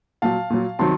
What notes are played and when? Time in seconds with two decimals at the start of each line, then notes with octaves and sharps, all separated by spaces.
0.22 A#2 F#3 F5 A5
0.50 A#2 F#3
0.79 C3 D#3 F#3 A5 C6